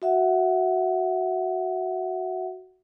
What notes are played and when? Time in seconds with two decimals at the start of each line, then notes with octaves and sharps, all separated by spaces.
0.02 F#4 E5 F#5